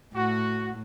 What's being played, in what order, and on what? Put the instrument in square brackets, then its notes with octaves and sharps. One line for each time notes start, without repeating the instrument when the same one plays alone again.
[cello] A2 [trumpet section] F#4